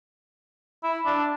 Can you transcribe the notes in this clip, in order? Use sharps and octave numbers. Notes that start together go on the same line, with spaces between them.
E4
D4